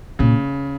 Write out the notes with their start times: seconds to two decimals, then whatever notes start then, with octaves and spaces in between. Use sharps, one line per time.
0.19 A#2 C#3